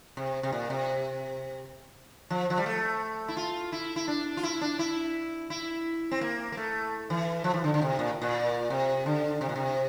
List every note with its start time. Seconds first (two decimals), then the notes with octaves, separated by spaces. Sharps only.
0.17 C3
0.43 C3
0.52 A#2
0.70 C3
2.30 F3
2.50 F3
2.58 G3
2.66 A3
3.28 E4
3.37 F4
3.72 E4
3.96 E4
4.08 D4
4.37 F4
4.43 E4
4.62 D4
4.79 E4
5.50 E4
6.12 C4
6.21 A#3
6.52 A#3
6.57 A3
7.10 E3
7.44 F3
7.54 E3
7.64 D3
7.74 D3
7.82 C3
7.99 A#2
8.22 A#2
8.70 C3
9.06 D3
9.41 C3
9.49 A#2
9.56 C3